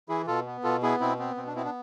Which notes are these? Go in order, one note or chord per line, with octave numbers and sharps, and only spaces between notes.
E3 E4 G#4
B2 F4 A4
B3
B2 F4 A4
B3 E4 G#4
B2 C4 E4
B3 C4
B2 C4
D4
B3 C4 E4
D4